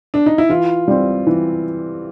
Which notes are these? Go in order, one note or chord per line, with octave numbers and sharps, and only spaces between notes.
D4
D#4
E4
E3 F4
G3 C4
E3